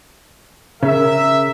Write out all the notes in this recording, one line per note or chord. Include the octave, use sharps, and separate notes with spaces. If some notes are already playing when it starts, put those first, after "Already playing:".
C#3 A#4 E5